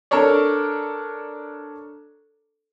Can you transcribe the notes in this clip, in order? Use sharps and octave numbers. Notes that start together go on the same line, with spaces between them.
D4 A4 A#4 C#5 D5